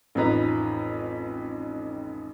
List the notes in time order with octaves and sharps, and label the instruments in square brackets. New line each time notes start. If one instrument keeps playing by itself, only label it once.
[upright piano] A1 F2 D#4 B4 A#5